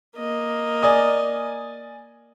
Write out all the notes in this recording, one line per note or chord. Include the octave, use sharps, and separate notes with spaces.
A#3 D#5
D5 G#5 D#6